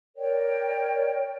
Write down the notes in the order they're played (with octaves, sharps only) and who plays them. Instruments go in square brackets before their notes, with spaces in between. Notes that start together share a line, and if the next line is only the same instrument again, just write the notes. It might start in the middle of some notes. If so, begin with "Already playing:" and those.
[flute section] A#4 C#5 D5 G5